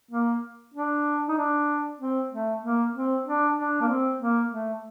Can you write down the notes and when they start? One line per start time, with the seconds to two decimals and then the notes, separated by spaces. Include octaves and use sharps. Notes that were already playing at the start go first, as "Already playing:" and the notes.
0.11 A#3
0.74 D4
1.29 D#4
1.37 D4
1.99 C4
2.31 A3
2.63 A#3
2.94 C4
3.26 D4
3.57 D4
3.81 A#3
3.88 C4
4.20 A#3
4.51 A3